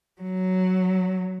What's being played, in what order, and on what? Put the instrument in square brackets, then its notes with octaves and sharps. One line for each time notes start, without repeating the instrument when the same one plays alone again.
[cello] F#3